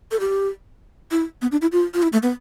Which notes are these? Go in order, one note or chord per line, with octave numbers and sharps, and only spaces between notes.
A4
G4
E4
B3
D4
E4
F4
F4
E4
A3
B3